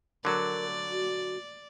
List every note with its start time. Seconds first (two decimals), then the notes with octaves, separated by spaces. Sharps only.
0.25 D3 F#3 A#4 D5
0.90 F#4